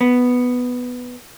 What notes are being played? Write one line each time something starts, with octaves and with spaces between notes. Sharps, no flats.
B3